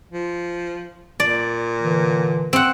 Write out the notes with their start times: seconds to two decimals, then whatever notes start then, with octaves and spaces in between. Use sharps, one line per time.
0.12 F3
1.20 A#2 D5
1.81 D3 E3
2.53 C4 F#5